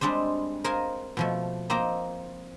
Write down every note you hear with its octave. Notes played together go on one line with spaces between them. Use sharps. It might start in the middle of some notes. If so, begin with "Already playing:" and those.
G3 G#3 C4 D4 C5
A#4 C5 D#5 F5 G#5
B2 F3 A3
A#3 C4 C5 D#5 A#5